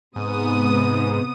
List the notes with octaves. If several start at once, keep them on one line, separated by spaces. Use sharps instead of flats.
G#2 C3 B3 D#6